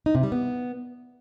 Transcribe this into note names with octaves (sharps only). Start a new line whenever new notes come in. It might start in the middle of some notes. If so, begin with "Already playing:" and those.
D#4
C3
G3
B3